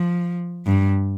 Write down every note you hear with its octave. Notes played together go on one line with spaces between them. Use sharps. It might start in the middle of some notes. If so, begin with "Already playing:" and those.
Already playing: F3
G2